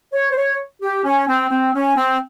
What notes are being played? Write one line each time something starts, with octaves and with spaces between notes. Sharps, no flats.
C#5
C5
C#5
G4
C#4
C4
C4
C#4
C4